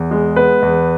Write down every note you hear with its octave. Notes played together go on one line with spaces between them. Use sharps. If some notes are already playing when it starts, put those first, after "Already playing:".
Already playing: E2
G#3
B3 B4
E2